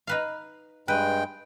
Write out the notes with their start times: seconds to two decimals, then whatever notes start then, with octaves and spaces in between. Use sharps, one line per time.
0.07 D#4 B4 F5
0.88 G2 G#3 B4 G5